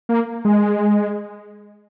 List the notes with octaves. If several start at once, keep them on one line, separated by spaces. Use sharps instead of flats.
A#3
G#3